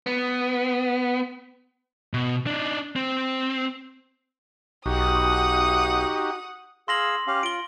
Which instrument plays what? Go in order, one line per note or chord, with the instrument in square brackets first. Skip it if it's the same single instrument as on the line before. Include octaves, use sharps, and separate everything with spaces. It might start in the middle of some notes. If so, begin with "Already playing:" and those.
[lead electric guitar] B3
B2
D4 D#4
C4
[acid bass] B1 [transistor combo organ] D#4 F#4 G4 [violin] F#5 D#6
[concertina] G#4 F5 E6 [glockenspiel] C6 A#6 F#7
[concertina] C#4 G4 F5
[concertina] F4 [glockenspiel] D7 G7